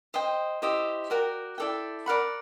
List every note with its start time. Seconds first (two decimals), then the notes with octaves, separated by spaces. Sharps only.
0.14 C5 D#5 G5
0.62 E4 G4 C5 D#5
1.10 F#4 A#4 D5 G5
1.58 E4 A4 D5 G5
2.06 A#4 D5 F#5 B5